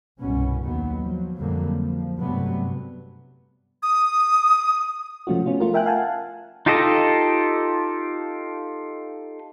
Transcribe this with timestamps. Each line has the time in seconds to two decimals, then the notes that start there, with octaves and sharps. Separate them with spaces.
0.18 C2 G2 B2 B3 C#4
0.62 D#2 A2 D#3 F#3 B3
1.00 F3 F#3
1.38 F2 A#2 D3 F#3 G3 A#3
1.81 F3
2.18 G2 C3 F#3 G3 A3 B3
3.83 D#6
5.27 C3 F3 A3 C#4 F4 F#4
5.46 B3 C#4 F4
5.60 A3 F4 A#4
5.73 A#4 E5 G5 G#5 F#6
5.86 F5 F#5 G#5 A5
6.66 D#4 F4 G4 A4 D#5